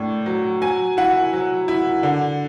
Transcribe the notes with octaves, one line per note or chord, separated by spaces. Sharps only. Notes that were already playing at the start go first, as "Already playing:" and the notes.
Already playing: A2 D4
F#3
F#3 G#5
E4 F#5
F#3
E4
D3